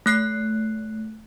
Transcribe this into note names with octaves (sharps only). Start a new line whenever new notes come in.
A3 F#6 C7